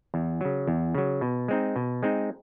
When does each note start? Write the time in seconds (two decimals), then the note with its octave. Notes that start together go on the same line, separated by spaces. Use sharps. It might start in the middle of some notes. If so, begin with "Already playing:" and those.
0.14 E2
0.41 C#3 F#3
0.67 E2
0.95 C#3 F#3
1.21 B2
1.48 G#3 C4 D#4
1.76 B2
2.03 G#3 C4 D#4